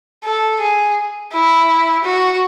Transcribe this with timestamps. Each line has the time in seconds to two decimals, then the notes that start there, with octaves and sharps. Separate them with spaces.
0.24 A4
0.60 G#4
1.33 E4
2.04 F#4